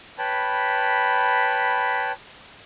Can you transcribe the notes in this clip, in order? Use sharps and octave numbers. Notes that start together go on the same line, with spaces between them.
B4 C#5 G5 A5 B5